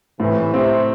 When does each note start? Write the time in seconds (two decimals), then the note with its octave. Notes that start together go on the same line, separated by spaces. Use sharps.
0.20 A2 C3 E3
0.54 C3 C4